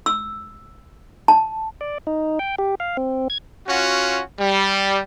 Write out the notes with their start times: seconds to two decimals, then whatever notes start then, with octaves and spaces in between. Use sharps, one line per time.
0.06 E6
1.28 A5
1.81 D5
2.07 D#4
2.39 G5
2.58 G4
2.80 F5
2.97 C4
3.30 G#6
3.68 C#4 F4 F#4
4.39 G3